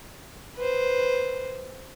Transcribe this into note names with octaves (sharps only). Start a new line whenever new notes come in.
B4 C5